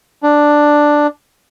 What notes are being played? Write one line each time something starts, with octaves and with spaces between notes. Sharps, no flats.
D4